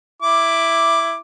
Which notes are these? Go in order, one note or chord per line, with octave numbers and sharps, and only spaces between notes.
E4 D6